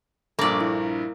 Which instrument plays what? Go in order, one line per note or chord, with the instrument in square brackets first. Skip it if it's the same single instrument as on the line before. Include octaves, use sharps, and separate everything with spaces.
[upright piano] A#1 G2 [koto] A#3 D5 [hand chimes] A4
[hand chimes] E4